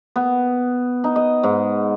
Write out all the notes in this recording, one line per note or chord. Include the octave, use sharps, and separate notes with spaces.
B3
D#4
D#5
G#2